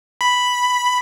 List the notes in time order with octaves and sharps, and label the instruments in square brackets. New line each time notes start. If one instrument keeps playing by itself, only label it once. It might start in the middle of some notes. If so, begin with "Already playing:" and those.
[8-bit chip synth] B5